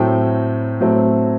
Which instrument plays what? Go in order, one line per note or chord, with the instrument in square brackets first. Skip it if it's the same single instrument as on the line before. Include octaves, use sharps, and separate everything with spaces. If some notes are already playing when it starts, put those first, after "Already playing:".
Already playing: [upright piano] A2 F#3 A3 C4 G5
A2 F#3 A3 C4